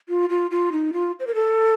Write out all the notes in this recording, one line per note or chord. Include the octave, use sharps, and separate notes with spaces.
F4
F4
F4
D#4
F4
C5
A#4
A4